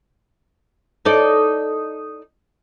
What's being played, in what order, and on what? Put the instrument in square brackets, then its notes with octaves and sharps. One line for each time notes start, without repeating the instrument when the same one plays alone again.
[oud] D#4 A4 D5